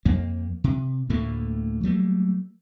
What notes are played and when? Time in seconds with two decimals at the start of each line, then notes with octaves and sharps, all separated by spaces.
0.05 F2 A#3
0.64 C3
1.09 D2 A2 A3 A#3
1.83 F#3 G3 A3 A#3